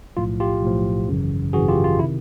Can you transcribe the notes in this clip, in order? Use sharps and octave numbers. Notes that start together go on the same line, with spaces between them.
B1 A2 F3 F4
F4 G4
B1 A2 F3
G#1 F#2 C#3 E3
G#1 F#2 C#3 E3 F#4 G#4
F4 G4
F4
C3 D#3 E4